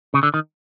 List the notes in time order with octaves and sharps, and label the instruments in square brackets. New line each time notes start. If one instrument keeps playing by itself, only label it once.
[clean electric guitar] C#3
D3
D#3